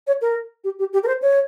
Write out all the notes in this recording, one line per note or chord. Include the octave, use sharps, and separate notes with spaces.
C#5
A#4
G4
G4
G4
A#4
C5
C#5